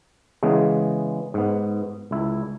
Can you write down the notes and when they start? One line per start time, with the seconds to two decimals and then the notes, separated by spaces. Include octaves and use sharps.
0.43 C#3 E3 G#3 B3
1.34 G#2 B3
2.11 C#2 E4